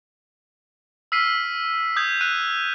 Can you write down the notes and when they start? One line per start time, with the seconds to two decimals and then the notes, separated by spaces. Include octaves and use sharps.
1.12 E6 F6 B6 C7 D#7
1.96 D#6 G6 G#6
2.21 F#6 D#7